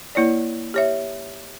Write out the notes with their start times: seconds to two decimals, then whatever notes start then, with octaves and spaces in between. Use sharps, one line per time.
0.15 A#3 E4 C#5 D5
0.74 G4 C#5 E5